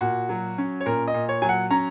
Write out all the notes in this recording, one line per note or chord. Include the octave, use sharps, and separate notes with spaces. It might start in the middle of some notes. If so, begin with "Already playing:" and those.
A#2 F#4
F#3
C#4
C#5
A#2 A#4
D#5
A#2
C#5
F#3 G#5
F#5
C#4 A#5